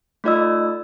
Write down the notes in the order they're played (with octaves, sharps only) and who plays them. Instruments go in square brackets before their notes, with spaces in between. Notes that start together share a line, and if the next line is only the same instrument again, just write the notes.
[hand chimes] A3 D#4 F4 D5 D#5 E6